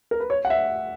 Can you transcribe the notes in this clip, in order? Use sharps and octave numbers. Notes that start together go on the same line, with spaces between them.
A#4
B4
C#5
F#5
E5